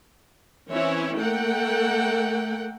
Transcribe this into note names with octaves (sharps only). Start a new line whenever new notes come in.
E3 C4 C#4 E4 C#5
A3 A#3 A#4 F#5 G5